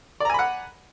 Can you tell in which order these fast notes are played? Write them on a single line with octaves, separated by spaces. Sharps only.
D5 A#5 G#5 B5 F#5